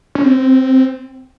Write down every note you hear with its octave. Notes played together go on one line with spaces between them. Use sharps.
C#4
C4